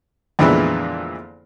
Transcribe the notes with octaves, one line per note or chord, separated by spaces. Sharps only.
F2 A#2 D3 E3 G#3 B3